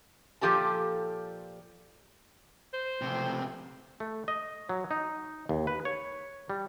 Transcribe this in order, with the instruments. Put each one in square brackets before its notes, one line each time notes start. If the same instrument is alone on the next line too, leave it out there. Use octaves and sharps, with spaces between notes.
[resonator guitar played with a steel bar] A#2 F3 G4 A4 A5
[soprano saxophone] C5
[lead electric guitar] C#2 C3 [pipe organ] F3 A3 C4
[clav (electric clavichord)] A3
D#5
F#3
D#4
D#2
B4
C#5
G3